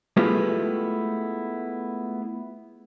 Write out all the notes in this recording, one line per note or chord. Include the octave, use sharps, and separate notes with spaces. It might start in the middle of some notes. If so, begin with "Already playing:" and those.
G#3 A3 B3 E4 F4 G4